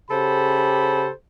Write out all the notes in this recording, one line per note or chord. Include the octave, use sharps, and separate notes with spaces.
C#3 G4 A4 C5 B5